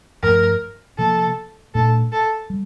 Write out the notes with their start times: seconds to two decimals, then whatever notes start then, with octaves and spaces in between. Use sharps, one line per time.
0.23 G2 F3 A3 A#4
0.98 C3 F3 A#3 A4
1.74 A#2 A3 D4 A4
2.12 A4
2.50 G3